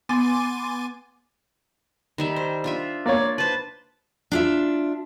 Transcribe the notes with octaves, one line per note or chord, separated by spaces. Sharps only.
B3 G#5 C6 D6 A6 D#7
D#3 G3 E5
C5
D4 F4 E5
A#3 C#5 D5
B4 C5 A5
D4 F4 E5